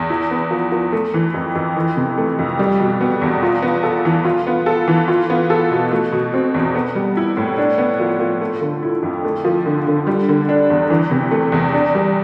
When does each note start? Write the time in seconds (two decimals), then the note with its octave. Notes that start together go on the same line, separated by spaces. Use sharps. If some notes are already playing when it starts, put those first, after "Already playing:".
Already playing: E2
0.10 E4
0.31 B3
0.51 F3
0.72 F3
0.92 A3
1.14 E3
1.34 F2
1.55 F2
1.77 E3
1.97 C3
2.17 A3
2.39 F2
2.59 G3
2.80 B2
3.01 B3
3.22 E2
3.42 F4
3.62 B3
3.83 A4
4.05 E3
4.25 F4
4.47 B3
4.66 A4
4.88 E3
5.08 F4
5.30 B3
5.50 A4
5.71 B2
5.91 A3
6.12 B2
6.34 C4
6.54 E2
6.75 B3
6.95 G3
7.17 E4
7.37 A2
7.58 D4
7.78 B3
8.00 F3
8.20 F3
8.41 A3
8.61 D3
8.83 E4
9.03 F2
9.24 A3
9.45 F3
9.66 D3
9.87 D3
10.07 G3
10.28 D3
10.49 D4
10.70 E2
10.90 E3
11.11 C3
11.31 A3
11.52 E2
11.73 D4
11.94 G3